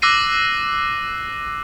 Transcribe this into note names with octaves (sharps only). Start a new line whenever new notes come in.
D6 E6 F#6 A#6 C7 D#7